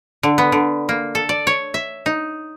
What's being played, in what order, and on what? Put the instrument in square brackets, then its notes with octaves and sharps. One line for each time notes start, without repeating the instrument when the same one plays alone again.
[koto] D3
B3
D3
A#3
A4
D5
C#5
E5
D#4